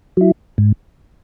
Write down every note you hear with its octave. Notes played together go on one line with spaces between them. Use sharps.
F#3 E4
G#2